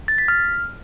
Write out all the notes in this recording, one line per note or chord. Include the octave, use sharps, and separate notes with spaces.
A6
B6
F6